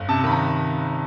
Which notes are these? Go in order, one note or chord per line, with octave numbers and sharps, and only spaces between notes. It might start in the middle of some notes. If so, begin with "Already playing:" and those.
Already playing: G1
C3 A5
D#3 B5
A#5